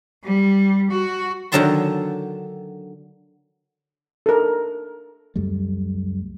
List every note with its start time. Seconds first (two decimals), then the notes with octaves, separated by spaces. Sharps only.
0.24 G3
0.91 F#4
1.52 D3 D#3 F#3 E5 A5 C6
4.26 A4 A#4
5.36 C#2 F#2 G3 A3